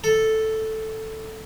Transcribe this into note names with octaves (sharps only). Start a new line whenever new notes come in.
A4